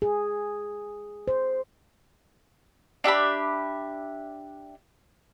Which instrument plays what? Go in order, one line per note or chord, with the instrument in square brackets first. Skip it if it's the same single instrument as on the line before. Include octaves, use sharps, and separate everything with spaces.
[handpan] G#4
C5
[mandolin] D4 G4 E5 B5